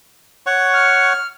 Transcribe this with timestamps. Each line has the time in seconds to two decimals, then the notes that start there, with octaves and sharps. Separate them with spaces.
0.46 C#5 F#5 C#6
0.73 F6